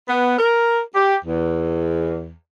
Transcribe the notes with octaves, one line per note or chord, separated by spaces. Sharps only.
B3
A#4
G4
E2